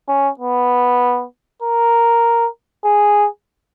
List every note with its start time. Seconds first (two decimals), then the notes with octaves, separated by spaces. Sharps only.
0.08 C#4
0.40 B3
1.63 A#4
2.85 G#4